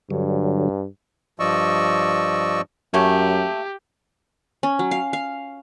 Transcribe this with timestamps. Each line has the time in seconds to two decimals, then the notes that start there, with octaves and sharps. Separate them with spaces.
0.10 G2 D3 F#3
1.40 G2 F3 D5 D#5 C#6 E6
2.94 F#2 A3 A#3 C#4 G4
4.63 C#4
4.79 F#3
4.91 F5
5.13 F5